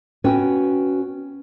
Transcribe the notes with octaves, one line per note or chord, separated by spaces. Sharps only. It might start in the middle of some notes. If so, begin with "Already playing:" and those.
B3 C#4 F#4 B4 G5